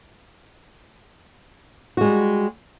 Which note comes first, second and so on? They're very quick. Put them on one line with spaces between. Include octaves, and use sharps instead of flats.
F#4 G#3 G3